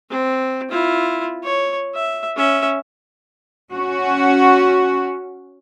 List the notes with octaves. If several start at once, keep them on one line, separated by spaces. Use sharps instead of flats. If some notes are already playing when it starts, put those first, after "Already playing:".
C4
E4 F4
C#5
E5
C#4 E5
C#4 F#4